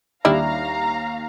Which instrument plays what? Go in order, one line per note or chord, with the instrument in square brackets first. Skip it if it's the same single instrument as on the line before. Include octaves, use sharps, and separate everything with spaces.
[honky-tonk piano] D#2 D#3 [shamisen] G3 D4 E4 [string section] F5 A#5